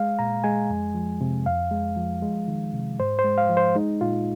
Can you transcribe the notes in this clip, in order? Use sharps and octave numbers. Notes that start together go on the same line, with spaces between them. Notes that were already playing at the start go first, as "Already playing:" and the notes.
Already playing: G#3 F5
A#2 A#5
G#3 G#5
F2
F3
C3
F2 F5
G#3
F3
G#3
D#3
C3
G#2 C5
C5
G#3
F5
F3
C5
G#3 D#4
A#2 F4